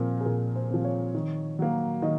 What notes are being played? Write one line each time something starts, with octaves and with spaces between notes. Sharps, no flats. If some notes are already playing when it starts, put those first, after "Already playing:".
Already playing: A#2 F3 C4 A#4
G#4
A#2 A#4
C5
F3 C4
C#5
D#3
F#3 A#3
D#3 D#5